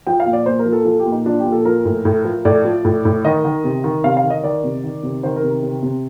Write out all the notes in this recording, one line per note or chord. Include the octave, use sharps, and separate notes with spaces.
F3 G5
F5
A#2
D5
A#2 C5
A#4
F3
A4
F3 A4
G4
A#2
D#4
F3 D4
G4
A#2
A4
F3 A#4
A2
A2
F3
A2 D5
F3
A2
A2
D#3 D#5
D#3
C3
D#3
C3 F5
F5
D#3
D#5
D#3 D5
C3
D#3
C3
D#3 C5
A#4
C3
C3
C3